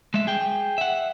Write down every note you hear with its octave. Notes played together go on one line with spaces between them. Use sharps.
G#3 E5
G#4 G5
E5 F#5